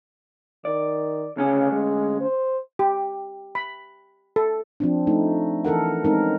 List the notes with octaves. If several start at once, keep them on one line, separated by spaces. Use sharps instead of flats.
D#3 D5
D2 C#3 C#4 G#5
G#3
C5
G4
B5
A4
F3 C4 D4
A3 D#4
E3 A4 A#4 F#5
G#3 C4 C#4 D#4 A#4